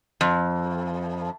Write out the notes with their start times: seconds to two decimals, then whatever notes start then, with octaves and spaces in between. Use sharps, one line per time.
0.21 F2